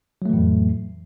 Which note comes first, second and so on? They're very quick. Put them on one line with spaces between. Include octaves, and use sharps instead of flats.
F#3 A3 E3 A2 F2